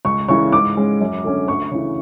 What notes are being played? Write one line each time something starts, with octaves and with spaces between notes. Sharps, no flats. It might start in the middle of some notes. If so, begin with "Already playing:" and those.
C#2 C#6
C#3 E3 G#3 C#6
G#2 D6
G#3 C#4
F#2
D3 A3 C#4
D2 C#6
C#3 E3